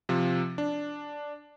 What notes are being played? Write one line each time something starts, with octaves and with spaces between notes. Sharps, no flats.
C3 F3
D4